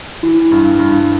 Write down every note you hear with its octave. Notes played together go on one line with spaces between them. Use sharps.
E3
G2
G2